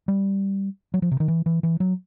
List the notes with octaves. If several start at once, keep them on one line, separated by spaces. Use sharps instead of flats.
G3
F#3
F3
C3
D#3
E3
E3
E3
F#3